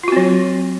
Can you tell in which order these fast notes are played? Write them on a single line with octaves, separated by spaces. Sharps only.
F4 F#4 C4 F#3